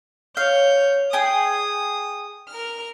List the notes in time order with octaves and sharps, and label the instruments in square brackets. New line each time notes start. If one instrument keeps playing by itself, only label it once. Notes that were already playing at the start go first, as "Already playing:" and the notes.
[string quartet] C#5 G6 [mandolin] F5
[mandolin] G#4 G5 G#5 [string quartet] D#6
[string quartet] A#4 F6